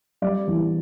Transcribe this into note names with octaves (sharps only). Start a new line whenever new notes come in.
G3 D5
E2